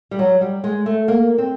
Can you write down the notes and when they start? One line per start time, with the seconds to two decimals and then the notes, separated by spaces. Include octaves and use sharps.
0.11 G3
0.19 F#3
0.41 G3
0.64 G#3
0.86 A3
1.08 A#3
1.38 C4